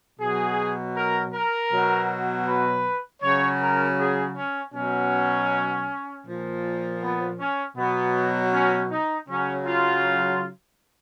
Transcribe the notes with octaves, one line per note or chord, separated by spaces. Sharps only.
B2 F#3 G#4
A#4
A#4
B2 F#3
B4
C#3 F#3 C#5
A#4
G#4
C#4
B2 F#3 C#4
A#2 F3
B3
C#4
B2 F#3 B3
C#4
D#4
C#3 F#3 C#4
F4